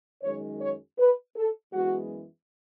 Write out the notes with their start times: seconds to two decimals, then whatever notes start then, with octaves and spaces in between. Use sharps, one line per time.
0.23 F#2 D#3 G#3 C#5
0.60 C#5
0.98 B4
1.36 A4
1.73 F#2 E3 G#3 B3 F#4